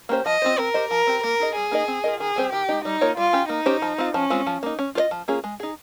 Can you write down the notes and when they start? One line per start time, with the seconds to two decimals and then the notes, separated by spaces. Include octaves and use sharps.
0.09 A#3 C#4 G4 C5
0.26 F3 D#5
0.42 C4 F4 C5
0.58 C4 A#4
0.74 G4 C5 D#5
0.91 F3 A#4
1.07 C4 G4
1.23 A#3 A#4
1.40 D#4 G#4 D#5
1.55 G3 G#4
1.71 A#3 D#4 A#4 D#5
1.88 C4
2.04 F4 A#4 D#5
2.20 D#3 G#4
2.36 G3 C4 G4 C5
2.52 D#3 G4
2.69 G#3 D#4
2.85 G3 D#4
3.01 A#3 F4 A#4 C#5
3.17 G3 F4
3.33 C#4 G4
3.49 A#3 D#4
3.66 C#4 G4 C5
3.82 F3
3.98 C4 F4
4.14 F3 C#4
4.30 G#3 C4 F4
4.47 F3
4.63 A#3 D#4
4.79 C#4
4.95 F4 C5 D#5
5.11 F3
5.28 A#3 C#4 F4 G#4
5.44 G#3
5.60 D#4 G#4